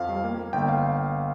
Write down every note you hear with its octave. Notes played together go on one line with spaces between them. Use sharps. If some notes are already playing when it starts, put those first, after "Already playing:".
Already playing: F2 F3 F5
G3
A#3
A#3
G1 G5
F5